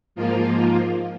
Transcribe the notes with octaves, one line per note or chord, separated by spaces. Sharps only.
G#2 F3 A#3 F4